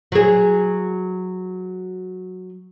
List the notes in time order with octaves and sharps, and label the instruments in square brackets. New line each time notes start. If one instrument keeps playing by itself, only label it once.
[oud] F#3 G#4